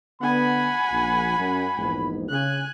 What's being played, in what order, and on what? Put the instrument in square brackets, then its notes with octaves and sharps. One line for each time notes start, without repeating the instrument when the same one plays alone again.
[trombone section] D3 B3 [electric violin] F#5 G#5 [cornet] B5
[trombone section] A#1
F#2
A#1 E2 G#2
[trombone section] C#3 [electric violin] G#5 F#6